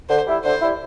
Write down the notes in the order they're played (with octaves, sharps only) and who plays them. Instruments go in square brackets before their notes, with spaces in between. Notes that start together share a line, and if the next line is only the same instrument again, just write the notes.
[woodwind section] D3 [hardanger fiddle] C5
[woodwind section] G3 E4
[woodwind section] D3 [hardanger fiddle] C5
[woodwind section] G3 E4